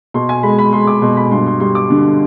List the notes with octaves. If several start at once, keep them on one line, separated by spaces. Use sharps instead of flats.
B2 C6
G#5
G#3 B5
B5
G#3 C6
D6
B2 C6
B5
G2 C6
C6
G3 C6
D6
D3